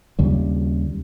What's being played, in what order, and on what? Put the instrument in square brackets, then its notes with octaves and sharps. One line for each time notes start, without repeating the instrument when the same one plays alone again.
[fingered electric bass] D#2 C#3 G3